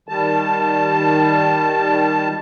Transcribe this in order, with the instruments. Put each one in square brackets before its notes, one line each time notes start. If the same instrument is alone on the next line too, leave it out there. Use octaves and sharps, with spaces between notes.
[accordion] D#3 G3 A5